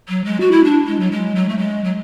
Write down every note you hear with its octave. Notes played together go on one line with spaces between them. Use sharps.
F#3
G#3
F#4
E4
D4
G#3
F#3
G#3
F#3
A3
G#3
F#3